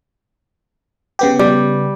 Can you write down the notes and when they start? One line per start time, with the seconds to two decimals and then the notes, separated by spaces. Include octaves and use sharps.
1.19 C#3 B3 G4
1.39 G3